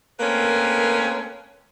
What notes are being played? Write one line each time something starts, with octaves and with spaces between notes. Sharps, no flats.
A3 A#3 C4 C#4 A#4 B4